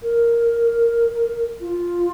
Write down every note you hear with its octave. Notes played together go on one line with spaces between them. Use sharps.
A#4
F4